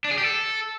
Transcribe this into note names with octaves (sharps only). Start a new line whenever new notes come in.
D4
G#4
G4
A4